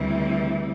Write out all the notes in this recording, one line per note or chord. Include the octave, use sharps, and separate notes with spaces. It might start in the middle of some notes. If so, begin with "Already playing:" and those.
Already playing: D2 C#3 E3 G3 C4